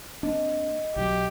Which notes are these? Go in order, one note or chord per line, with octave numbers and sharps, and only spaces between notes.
A#3 C4 D4 D#5
B1 D#3 F#3 G4